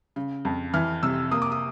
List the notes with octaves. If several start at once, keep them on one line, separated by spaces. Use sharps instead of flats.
C#3
F2
E3 F6
C3 E6
A#3 D#6
D6
D#6